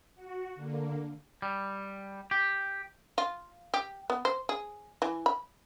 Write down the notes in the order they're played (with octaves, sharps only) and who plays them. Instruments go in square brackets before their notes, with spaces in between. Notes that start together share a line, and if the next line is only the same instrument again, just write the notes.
[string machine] F#4
D3 A#3
[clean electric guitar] G3
G4
[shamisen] F4
G4
B3
C5
G#4
E3
B5